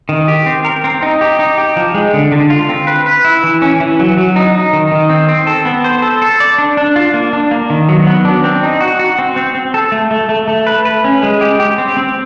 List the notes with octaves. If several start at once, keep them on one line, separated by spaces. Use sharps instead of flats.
D#3
G4
C4
A#4
C4
D#4
G4
D#4
G4
F3
G#3
D3
D3
F4
C4
B4
B4
E4
E3
C#4
E3
F#3
F#3
D#4
D#4
D#3
D#3
C4
C4
A4
B3
C5
A4
A4
D5
D4
D4
F4
A#3
D4
A#3
D#3
F#3
B3
D4
C4
D#4
F#4
F#4
C4
C4
C4
A4
A3
A3
A3
A3
B4
B4
C#4
G#3
G4
G4
C4
C4